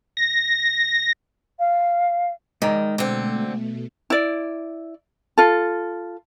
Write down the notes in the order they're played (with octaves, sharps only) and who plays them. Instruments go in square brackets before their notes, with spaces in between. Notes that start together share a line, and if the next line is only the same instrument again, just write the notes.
[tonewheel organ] A#6
[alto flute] F5
[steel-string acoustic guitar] D#3 [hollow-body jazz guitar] G#3 D5 A#5
[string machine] B2 A3 [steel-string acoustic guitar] D3 C4
[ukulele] E4 D5
F4 A4